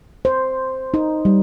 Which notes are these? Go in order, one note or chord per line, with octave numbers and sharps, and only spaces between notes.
C5
D#4
G3